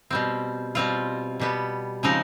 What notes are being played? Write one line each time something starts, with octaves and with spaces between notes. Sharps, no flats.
B2 G3 C4
B2 G3 C4 F4
B2 G3 B3
C#3 F3 G#3 C4 D#4